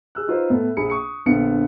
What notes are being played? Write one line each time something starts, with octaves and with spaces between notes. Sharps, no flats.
G#4 E6 F#6
D#4 F4 B4 C5
A2 A3 B3
A#1 G#4 B5 C#7
C#6 D#6 C#7
A#1 D3 B3 F5 C#7